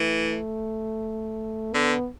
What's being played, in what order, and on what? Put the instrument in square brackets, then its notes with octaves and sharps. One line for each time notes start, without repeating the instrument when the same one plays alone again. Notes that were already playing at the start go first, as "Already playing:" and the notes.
Already playing: [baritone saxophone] E3 [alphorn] A3
[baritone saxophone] D3 [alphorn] B3